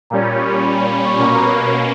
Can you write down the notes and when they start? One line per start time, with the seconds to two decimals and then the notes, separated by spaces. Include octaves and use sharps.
0.10 A#2 G3 C#4 A#5
0.23 B5
0.37 C#6
0.51 B5
0.64 B5
0.78 B5
0.92 B5
1.05 C#6
1.19 B2 A#3 C#4 C#6
1.27 B5
1.35 A#5
1.43 B5